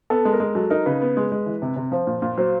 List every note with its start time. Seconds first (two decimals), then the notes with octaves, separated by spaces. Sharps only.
0.10 B3 A4
0.25 G#3
0.33 A#4
0.40 G#3
0.55 F#3 A4
0.70 D#4 A#4
0.86 C#3 B4
1.02 B3
1.17 G#3
1.32 G#3
1.46 E3
1.62 C3
1.76 C3
1.92 F3 C5
2.07 A#2
2.22 A#2
2.38 F#3 C5